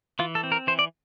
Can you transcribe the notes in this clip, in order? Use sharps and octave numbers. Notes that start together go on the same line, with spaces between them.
E3 F4
A4
C4
A#4
E3 C5
D5